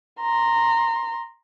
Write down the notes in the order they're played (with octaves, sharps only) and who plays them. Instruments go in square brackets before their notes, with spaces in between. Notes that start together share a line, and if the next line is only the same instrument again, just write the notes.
[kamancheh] A#5 C6